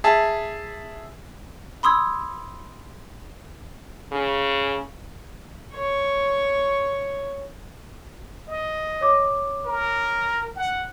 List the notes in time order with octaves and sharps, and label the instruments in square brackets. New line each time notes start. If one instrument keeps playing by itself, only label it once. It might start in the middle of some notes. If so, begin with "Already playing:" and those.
[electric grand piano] G#4 E5 A5
[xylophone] B5 C6 D#6 E6 G#6
[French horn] C#3
[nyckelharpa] C#5 C#6
[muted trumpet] D#5
[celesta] C#5 D6
[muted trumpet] A#4
F#5